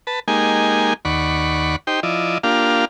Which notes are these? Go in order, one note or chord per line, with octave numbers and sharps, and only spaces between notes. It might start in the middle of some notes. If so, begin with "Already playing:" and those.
B4 A5
G#3 A#3 D#4 G4 G#5
D#2 D5 F#5 B5 C#6
D#4 G4 C5 G5
F3 E4 D5 D#5
A#3 D4 F4 G4 F5